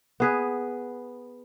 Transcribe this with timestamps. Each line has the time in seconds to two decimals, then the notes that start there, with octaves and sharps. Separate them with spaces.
0.20 B3 G#4 B4